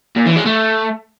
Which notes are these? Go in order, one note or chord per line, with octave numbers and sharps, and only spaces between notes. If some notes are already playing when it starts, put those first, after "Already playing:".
A#2
E3
G#3
A3